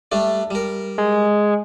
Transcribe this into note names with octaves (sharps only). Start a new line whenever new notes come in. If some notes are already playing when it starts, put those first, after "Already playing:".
G3 A3 D4
G3 A#4
G#3